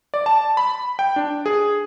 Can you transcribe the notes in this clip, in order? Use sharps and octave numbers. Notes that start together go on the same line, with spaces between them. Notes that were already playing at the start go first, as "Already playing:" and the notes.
D5
A5
B5
G5
D4
G#4